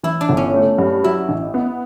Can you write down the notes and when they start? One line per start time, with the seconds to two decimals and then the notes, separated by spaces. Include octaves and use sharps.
0.03 E3 E4
0.21 D4
0.29 G1
0.37 C#4
0.54 A3
0.78 G2
1.04 F#3 E4
1.29 A1
1.54 B3